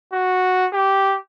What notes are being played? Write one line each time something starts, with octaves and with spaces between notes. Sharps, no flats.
F#4
G4